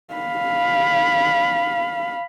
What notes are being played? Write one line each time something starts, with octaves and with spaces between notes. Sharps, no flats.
F5 B5